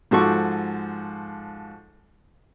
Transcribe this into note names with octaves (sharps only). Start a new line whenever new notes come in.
G#2 F3 F#4 A4 C#6 D6